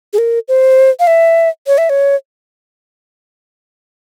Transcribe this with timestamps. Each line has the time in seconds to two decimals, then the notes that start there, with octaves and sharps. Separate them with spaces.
0.13 G#4
0.18 A#4
0.48 C5
1.00 F5
1.07 E5
1.67 C#5
1.78 E5
1.90 C#5